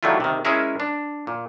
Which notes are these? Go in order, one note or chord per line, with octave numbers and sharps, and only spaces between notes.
D#3 F#3 G3 A3 E4 F4
C3 D#3
G#3 C#4 E4 G#4 A#4 E5
D4
A#2